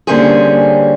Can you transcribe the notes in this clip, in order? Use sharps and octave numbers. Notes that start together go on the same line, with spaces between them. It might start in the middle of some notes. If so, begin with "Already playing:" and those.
D3 G3 A#3 C4 C#4 G#4